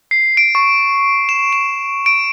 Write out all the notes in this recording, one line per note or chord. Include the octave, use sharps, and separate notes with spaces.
C7
D7
C#6
E7
E7
D7